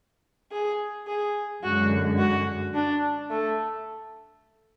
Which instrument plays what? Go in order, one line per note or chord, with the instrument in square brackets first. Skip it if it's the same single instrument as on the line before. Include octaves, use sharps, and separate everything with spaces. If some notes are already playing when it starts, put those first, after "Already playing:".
[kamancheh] G#4
G#4
[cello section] F#2 D3 G#3 [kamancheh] F#4
[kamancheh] F#4
D4
A3